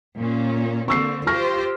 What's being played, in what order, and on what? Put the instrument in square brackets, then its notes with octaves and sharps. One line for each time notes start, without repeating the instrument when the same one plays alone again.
[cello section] A#2 C#4
[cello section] D3 A#3 C4 [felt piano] C#6 E6 C7
[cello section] F4 G4 C5 [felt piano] C#6 F6 A#6